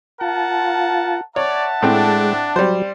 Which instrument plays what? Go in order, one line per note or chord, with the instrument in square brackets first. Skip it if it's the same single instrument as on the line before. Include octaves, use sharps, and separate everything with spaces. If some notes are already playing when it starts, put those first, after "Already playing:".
[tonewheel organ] F4 [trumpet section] A#4 A5 [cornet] F#5
[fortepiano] C#5 [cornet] D5 [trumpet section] E5 F#5 A5
[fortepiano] A2 C4 G5 [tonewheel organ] G#3 [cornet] D4
[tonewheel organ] F#3 [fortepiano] G3 C5